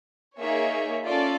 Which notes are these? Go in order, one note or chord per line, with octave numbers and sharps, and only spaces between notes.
A#3 D#4 G#4 C#5 E5
C#4 F4 A4 D5